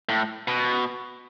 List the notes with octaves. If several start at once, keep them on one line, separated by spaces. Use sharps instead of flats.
A2
B2